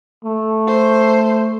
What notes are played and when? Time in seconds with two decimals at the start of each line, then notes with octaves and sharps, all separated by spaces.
0.24 A3
0.68 C5